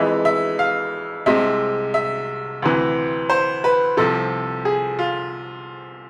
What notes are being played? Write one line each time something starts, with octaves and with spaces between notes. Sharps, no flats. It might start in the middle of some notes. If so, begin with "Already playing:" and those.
Already playing: F2 E3 G#3 E5
E5
F5
C2 C3 G#3 E5
E5
D2 C3 E3
C5
B4
C2 C3 F3 A4
G#4
F4